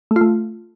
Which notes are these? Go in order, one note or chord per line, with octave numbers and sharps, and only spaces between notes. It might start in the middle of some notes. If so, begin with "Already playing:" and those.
A3
F4
A3